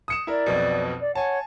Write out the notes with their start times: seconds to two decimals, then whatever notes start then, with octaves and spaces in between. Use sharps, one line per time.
0.08 D#6 C#7 E7
0.27 E4 A#4 D5
0.46 B1 F2 B2
1.00 D5
1.15 C#5 F#5 G#5 A5